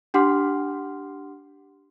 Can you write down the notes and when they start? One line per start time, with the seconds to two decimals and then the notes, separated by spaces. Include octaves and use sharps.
0.14 D4 G4 F#5 C6 D6 F6